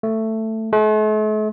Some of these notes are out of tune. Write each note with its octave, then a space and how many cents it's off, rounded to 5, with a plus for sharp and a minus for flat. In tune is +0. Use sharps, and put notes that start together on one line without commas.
A3 +10
A3 -45